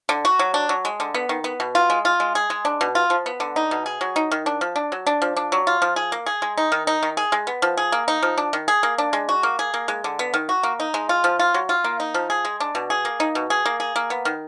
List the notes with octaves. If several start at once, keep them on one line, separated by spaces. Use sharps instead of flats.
D3
F#4
F#3
D4
F#3
G#3
D3
B3
D#3
B3
B2
F4
G#3
F4
G#3
G#4
G#3
D4
B2
F4
F3
B3
D3
D#4
B2
G#4
F#3
D#4
D#3
D4
F3
D4
F#3
D4
F3
D4
F#3
F4
F3
G#4
A#3
G#4
G#3
D#4
D#3
D#4
D#3
G#4
G#3
B3
F3
G#4
A#3
D#4
F3
D4
D#3
G#4
A#3
D4
G#3
F#4
A#3
G#4
A#3
G#3
D3
B3
D#3
F#4
A#3
D#4
G#3
F4
F3
F4
F#3
F4
A#3
D#4
F3
G#4
G#3
D4
B2
G#4
A#3
D#4
B2
G#4
A#3
G#4
A#3
B3
D#3